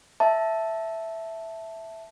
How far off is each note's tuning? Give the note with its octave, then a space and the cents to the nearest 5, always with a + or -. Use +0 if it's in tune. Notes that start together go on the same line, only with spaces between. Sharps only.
E5 +0 A5 +0